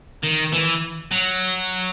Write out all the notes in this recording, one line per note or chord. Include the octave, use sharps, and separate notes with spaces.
D#3
E3
F#3